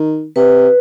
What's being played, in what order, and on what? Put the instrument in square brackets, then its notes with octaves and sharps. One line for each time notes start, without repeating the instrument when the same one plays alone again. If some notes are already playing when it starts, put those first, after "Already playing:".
Already playing: [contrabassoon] D#3
[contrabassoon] C3 [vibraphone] B4